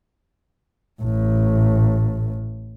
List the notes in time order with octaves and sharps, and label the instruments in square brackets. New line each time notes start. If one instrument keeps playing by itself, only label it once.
[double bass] A1 A2